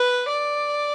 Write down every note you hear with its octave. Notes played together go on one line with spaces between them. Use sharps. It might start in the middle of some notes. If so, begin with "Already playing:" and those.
Already playing: B4
D5